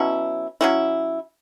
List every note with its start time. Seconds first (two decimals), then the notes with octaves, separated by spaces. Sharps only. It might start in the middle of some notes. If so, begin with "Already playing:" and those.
Already playing: B2 F#3 C#4 E4
0.61 F#3 C#4 E4